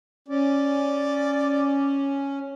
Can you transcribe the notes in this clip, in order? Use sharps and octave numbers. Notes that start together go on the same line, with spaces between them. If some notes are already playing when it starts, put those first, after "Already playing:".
C#4 D5